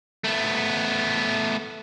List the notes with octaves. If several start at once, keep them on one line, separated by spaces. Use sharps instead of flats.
A3 B3